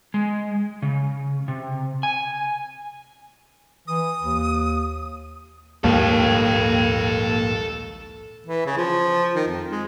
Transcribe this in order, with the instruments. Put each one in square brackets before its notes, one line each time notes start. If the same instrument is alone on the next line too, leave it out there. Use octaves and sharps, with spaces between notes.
[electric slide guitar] G#3
C#3
C3
G#5
[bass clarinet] E3 [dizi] D#6
[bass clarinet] D#2
[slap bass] A#1 G#2 G3 [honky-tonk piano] D#2 [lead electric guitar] A4 G5
[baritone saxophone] E3
C#3
F3
D#3
F2
G#3